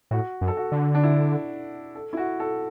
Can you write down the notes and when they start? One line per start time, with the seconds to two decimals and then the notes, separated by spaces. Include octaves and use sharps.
0.11 A2 F#4
0.41 F#2
0.48 A4
0.57 F#4
0.72 D3
0.95 D4
1.03 E4
1.95 A4
2.13 E4
2.17 F#4
2.40 A4